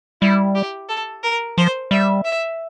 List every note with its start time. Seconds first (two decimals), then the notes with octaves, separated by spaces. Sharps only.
0.22 G3 E4
0.55 G4
0.89 A4
1.23 A#4
1.58 F3 C5
1.91 G3 E5
2.25 E5